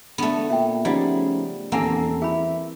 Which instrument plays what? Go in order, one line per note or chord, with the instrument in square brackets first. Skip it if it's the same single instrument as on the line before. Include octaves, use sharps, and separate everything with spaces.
[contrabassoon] D3 [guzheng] A3 B3
[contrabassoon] A#2 [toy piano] E5 G5
[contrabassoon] C#3 [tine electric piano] F3 A3 D#4 [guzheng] G3 [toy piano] D5 F#5
[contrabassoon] D#1 [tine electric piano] E2 A4 [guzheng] A#3 C4 [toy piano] A#4 F#5 G#5
[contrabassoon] E3 [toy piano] G#4 B5 [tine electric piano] E5